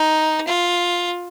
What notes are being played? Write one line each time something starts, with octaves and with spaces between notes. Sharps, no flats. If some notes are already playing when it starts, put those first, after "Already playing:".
Already playing: D#4
F4